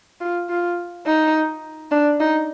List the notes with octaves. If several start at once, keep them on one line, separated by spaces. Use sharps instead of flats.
F4
F4
D#4
D4
D#4